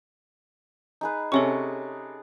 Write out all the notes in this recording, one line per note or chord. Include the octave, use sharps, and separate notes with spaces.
D#4 G#4 B4
C3 C#4 G#4 A4 C#5 A5 C#6 D#6